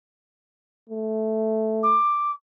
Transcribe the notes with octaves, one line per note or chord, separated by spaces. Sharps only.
A3
D6